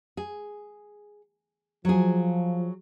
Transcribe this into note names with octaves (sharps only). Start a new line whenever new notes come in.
G#4
F3 F#3 G#4